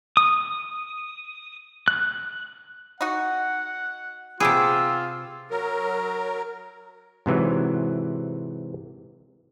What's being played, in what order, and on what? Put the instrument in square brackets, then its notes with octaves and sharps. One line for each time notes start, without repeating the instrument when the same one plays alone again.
[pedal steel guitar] D#6
F#6
[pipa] D#4 F#4 [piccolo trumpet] F#5
[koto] C3 G#4 [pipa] B3 G4 [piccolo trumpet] F4 [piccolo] E6
[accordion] F#3 A#4
[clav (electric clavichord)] G#2 C3 E3 F#3